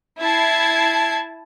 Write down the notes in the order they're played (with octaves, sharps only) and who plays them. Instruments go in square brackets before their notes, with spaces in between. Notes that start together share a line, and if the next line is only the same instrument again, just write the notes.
[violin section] E4 A5 G#6 C7